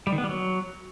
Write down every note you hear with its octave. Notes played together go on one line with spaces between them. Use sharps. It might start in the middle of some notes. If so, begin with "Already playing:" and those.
G3
D#3
B3
G3
F#3